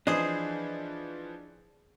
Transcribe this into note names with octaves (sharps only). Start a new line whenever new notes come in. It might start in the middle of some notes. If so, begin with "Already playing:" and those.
E3 F3 D4 G#4 B4 C5 D#5